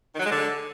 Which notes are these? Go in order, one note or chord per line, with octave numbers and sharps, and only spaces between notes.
D#3
F#3
G#3
D3